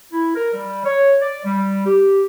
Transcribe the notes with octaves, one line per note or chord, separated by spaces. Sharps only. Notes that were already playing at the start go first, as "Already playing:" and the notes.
E4
A#4
G3
C#5
D5
G3
G4